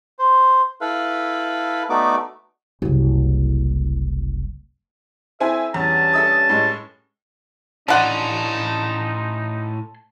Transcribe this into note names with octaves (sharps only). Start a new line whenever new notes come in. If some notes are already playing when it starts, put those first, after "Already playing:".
C5
E4 A4 B4 F5
A3 B3 D#4 F#4 D5 D6
F#1 C2
C4 E4 A4 E5 G#5
E2 G2 C#4 A5
A4 E5 D#6
A2 G#3
A2 D3 C#4 D#4 F#5 A5 C6